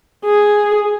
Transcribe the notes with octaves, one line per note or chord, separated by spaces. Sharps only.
G#4